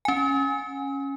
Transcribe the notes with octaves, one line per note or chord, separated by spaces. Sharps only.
C#4 G#5